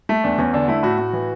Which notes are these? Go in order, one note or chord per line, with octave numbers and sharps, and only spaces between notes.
A3
E2 D4
E2 C#4
D3 D4
A3 E4
A2 F#4
A2
E3